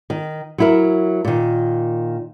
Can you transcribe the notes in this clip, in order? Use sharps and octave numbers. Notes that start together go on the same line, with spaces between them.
D#3
F#3 E4 A#4
A#2 D#3